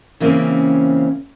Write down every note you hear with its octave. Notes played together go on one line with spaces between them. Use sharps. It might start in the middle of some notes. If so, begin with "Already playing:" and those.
C#3 E3 A#3 C4 C#4